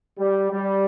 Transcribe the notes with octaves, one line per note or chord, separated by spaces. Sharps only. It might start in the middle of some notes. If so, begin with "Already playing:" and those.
G3
G3